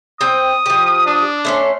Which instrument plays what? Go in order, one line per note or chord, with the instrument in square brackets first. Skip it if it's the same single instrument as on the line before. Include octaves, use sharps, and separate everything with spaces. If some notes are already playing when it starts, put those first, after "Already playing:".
[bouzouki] C4 G5 [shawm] D#6
[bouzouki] F3 G4
[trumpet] D4
[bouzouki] A3 B3 C#4 [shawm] C6